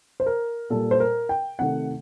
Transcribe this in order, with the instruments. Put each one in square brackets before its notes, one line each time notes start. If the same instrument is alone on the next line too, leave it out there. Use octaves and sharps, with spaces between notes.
[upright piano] C5
A#4
A#2 G3 A4
C5
A#4
G5
C3 D#3 A3 F#5